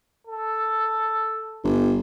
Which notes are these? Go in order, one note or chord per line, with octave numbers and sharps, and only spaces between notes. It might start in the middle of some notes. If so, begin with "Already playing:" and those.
A4
G1